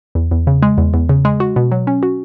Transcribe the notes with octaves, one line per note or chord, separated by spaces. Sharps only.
E2
E2
C#3
G#3
E2
E2
C#3
G#3
F#4
B2
F#3
C#4
F#4